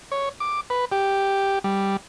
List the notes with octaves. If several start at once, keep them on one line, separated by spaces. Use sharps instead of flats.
C#5
D6
B4
G4
G3